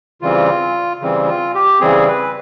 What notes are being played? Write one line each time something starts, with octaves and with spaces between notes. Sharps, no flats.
C#3 E3 G3 C4 F4
C#3 E3 G3 C4
F4
G4
C#3 E3 G3 C4 G#4
B4